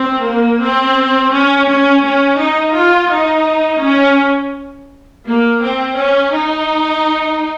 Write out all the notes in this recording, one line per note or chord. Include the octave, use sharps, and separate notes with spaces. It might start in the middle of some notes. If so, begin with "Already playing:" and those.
Already playing: C4
A#3
C4
C#4
C#4
C#4
D#4
F4
D#4
C#4
A#3
C4
C#4
D#4